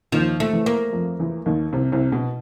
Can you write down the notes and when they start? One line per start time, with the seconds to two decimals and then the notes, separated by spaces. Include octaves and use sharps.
0.12 D#2 D#3 F3
0.40 A3
0.53 E2 E3
0.66 A#3
0.93 F2 F3
1.19 E2 E3
1.46 D#2 D#3
1.72 C2 C3
1.92 C2 C3
2.12 B2